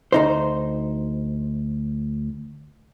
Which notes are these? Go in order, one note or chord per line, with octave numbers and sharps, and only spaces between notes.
D2 D#4 C5